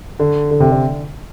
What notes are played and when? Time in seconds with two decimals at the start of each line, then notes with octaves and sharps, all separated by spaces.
0.19 D3
0.51 D3
0.60 C3
0.71 D3